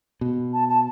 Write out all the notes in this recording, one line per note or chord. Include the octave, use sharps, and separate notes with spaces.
B2
A5
A5